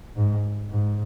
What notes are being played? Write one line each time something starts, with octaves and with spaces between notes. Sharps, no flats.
G#2
G#2